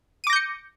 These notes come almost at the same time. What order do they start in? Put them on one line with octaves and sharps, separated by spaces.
D#7 D6 A#6 G6 C#7